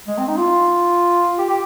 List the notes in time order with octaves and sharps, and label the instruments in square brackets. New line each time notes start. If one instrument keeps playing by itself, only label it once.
[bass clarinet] G#3
C4
D#4
F4
G4
G4